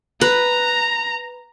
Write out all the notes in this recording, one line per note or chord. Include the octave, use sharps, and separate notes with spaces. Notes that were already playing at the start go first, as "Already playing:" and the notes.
B4 A#5